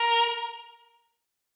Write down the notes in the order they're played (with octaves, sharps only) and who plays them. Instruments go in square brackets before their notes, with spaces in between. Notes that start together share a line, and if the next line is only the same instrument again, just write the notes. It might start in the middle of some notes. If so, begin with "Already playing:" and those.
Already playing: [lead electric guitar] A#4